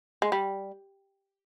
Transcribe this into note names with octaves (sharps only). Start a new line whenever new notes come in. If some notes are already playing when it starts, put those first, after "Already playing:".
G#3
G3